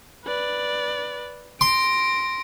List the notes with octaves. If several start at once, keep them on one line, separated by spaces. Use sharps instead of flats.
B4 D5
C6 A#6 D7